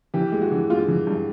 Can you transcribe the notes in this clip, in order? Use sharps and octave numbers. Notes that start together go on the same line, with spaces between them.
E3 G4
G#3
F#4
E3
G#3 F4
E3
G2